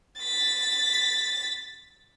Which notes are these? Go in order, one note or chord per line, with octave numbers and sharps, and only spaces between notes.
A6 B6